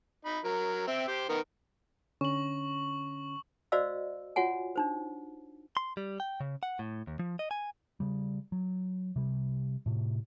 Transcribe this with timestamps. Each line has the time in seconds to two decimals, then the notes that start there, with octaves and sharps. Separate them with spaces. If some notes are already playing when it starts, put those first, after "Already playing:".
0.25 D#4 B5
0.44 F#3 A#4
0.87 C4 E5 G5
1.08 G4 C5
1.29 D#3 B3 A#4
2.21 D3 C#4 C#6 F#7
3.72 F#4 C5 D5 D#5 F5 E6
4.36 F4 F#4 C#5 F#5 G#5
4.76 D4 D#4 C5
5.77 C6
5.97 G3
6.20 G5
6.40 C#3
6.63 F#5
6.79 A2
7.07 D#2
7.19 F3
7.39 D#5
7.51 G#5
8.00 C#3 G3
8.52 F#3
9.16 C3 G3
9.86 A2 C3